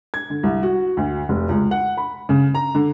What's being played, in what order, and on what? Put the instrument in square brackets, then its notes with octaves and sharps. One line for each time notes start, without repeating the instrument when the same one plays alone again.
[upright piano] G#6
D3
C2
F#4
D2
F1
C#2
F#5
B5
C#3
A#5
D3